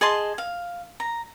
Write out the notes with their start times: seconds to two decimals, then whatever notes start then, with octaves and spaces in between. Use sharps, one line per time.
0.01 G#4 D#5 A5 C6
0.38 F5
1.00 A#5